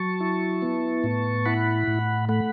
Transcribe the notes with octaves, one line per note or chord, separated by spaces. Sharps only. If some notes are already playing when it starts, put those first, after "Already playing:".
Already playing: F#3 A5 C#6
E4
B3
A2
E4 F#5 B5
A2
A3 F#5 B5